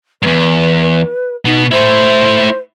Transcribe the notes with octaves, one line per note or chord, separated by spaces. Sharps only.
E2 G2 B4
B2 B3 D#4
A3 E4 C5